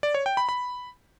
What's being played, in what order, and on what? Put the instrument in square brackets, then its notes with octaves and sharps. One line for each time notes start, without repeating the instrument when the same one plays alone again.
[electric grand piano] D5
C#5
G5
B5
B5